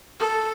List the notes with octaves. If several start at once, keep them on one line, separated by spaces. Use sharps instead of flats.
A4